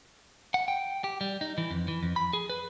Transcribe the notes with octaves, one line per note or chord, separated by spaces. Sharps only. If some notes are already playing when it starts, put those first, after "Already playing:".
F#5
G5
G4
G3
D#4
E3
F2
E3
F2
B5
G#4
B4